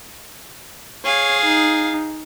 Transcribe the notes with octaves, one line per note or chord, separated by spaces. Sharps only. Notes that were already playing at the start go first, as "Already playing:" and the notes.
G#4 C#5 F5
D#4